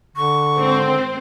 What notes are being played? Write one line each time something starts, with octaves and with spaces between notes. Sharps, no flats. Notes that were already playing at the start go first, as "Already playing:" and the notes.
D3 C#6
G#1 C4 C5